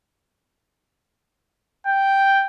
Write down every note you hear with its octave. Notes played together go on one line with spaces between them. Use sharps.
G5